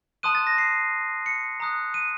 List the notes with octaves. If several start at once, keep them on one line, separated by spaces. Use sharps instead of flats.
A5 C6 D#6 F#6 D#7
A6
A#6
C7
C#7
A#5 D#6 F#6
D#7